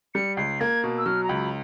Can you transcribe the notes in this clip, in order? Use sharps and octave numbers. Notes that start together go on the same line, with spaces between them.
G3 C#7
C#2 C7
A#3 G#6
B2
E6
F#3 F6
A#5
C#2 B5